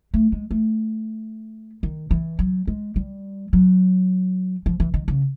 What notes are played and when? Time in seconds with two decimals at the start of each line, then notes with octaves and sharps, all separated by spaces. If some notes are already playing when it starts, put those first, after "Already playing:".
0.14 A3
0.32 G#3
0.51 A3
1.83 D#3
2.11 E3
2.39 F#3
2.67 G#3
2.96 G3
3.53 F#3
4.66 F3
4.80 E3
4.94 D#3
5.08 C#3